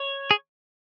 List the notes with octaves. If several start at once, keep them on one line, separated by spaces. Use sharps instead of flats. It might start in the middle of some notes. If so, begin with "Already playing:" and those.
Already playing: C#5
G#4